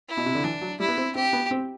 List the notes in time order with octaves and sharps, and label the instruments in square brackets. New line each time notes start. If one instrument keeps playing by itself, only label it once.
[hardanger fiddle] E4
[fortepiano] B2
C3
D3
[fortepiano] E3 [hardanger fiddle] D4
[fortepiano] F#3
[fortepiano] G3 [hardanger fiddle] E4
[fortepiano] B3
C4
[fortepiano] C4 [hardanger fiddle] G4
[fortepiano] B3
C4